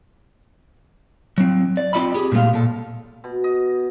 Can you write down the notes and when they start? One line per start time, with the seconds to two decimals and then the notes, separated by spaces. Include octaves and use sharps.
1.38 F#3 C4
1.77 D5
1.93 C4 F4 D5 D#5 B5
2.14 G4 G#4
2.32 A#2 F3 G#3 A3 F5
2.54 A#2 A4
3.24 B2
3.44 D#5